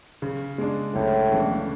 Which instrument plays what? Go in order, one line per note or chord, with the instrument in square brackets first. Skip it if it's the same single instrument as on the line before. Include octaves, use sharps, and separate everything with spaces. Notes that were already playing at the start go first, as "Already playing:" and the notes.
[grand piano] C#3
G#3 D4
[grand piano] C#2 [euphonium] A2
[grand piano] C#3 E3 A3 D4